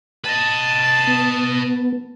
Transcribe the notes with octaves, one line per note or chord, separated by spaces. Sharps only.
B4 D#5 A5
B3